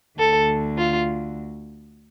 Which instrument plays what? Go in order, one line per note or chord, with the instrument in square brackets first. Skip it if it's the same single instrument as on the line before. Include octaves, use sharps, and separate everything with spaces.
[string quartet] D2 D3 A4
F4